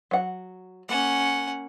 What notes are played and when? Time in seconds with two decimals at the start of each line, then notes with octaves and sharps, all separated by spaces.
0.11 F#3 F#5
0.89 A#3 C#4 F#5